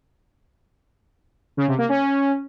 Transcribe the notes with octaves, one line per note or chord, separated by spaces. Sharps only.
C#3
C3
A#3
C#4